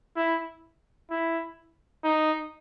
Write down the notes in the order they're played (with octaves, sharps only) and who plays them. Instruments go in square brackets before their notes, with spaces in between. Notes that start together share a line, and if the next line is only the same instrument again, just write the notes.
[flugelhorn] E4
E4
D#4